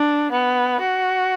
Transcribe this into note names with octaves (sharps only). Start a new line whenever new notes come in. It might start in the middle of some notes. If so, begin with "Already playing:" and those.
Already playing: D4
B3
F#4